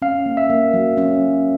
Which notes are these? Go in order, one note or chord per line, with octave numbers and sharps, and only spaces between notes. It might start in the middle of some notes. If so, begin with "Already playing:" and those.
C#4 F5
A#3
E5
A#3
F#3
C#4